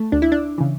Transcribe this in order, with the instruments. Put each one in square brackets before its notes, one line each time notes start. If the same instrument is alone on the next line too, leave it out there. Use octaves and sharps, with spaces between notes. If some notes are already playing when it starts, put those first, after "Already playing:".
Already playing: [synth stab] A3
D2 D4
E4
D4
C#3 E3